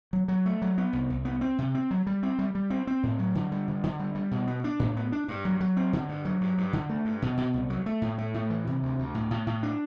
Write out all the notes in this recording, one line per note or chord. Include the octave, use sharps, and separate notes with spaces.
F#3
F#3
A3
F#3
B3
C2
C2
B3
C4
C3
C4
F#3
G3
C4
G3
G3
C4
C4
A2
F#3
D3
G3
D3
D3
G3
G3
B2
B3
D4
A2
B3
D4
G2
F#3
F#3
C4
D3
G2
F#3
G2
G2
D3
A3
G2
B2
B2
C2
F#3
A3
A2
A3
A2
E3
C3
D2
D2
A2
A2
A2
D4